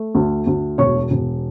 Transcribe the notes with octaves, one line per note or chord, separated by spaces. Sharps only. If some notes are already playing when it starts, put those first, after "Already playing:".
Already playing: A3
D2
D2
E1 C#5 C#6
E1